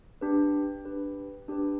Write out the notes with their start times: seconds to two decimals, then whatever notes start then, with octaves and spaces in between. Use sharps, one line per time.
0.21 D4 G4 B4
0.85 D4 G4 B4
1.48 D4 G4 B4